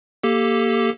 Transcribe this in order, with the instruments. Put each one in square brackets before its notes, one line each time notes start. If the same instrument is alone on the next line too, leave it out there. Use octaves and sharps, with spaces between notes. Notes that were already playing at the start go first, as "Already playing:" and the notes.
[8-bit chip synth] A#3 G4 A4